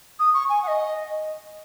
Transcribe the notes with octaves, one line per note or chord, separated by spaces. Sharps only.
D#6
C#6
G#5
F#5
D#5